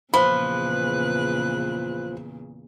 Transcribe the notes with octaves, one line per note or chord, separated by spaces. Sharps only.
E2 A#2 C#3 F3 B4 B5 F#6